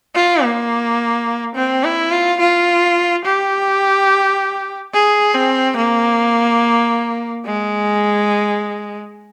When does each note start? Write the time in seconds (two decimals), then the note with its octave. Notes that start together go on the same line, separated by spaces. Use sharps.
0.15 F4
0.43 A#3
1.56 C4
1.84 E4
2.12 F4
2.40 F4
3.25 G4
4.93 G#4
5.35 C4
5.77 A#3
7.46 G#3